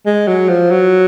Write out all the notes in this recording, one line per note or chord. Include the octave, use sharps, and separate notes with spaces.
G#3
F#3
F3
F#3